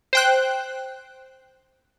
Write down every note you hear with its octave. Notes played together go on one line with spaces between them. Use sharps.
C5 G5 F#6